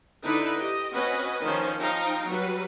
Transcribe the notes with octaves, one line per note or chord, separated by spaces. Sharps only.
D3 D#4 E4 B4 D5 B5
G4 D#5
C4 C#4 F#4 B4 D#5
D#3 F3 C#4 C5
F3 D#4 F5 G5 A#5
F#3 G3 B4